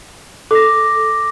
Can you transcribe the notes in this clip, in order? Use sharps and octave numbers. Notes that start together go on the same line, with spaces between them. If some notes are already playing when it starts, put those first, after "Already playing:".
A4 D6 A#6